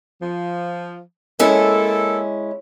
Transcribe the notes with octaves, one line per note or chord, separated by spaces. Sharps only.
F3
G#3 A#3 C#4 E4 A4